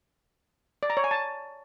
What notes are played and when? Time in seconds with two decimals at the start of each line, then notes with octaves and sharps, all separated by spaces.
0.83 D5
0.90 A#5
0.97 C#5
1.04 G#5
1.11 A5